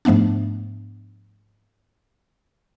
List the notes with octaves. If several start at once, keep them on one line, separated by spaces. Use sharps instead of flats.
G#2 F3 A3 B3 D4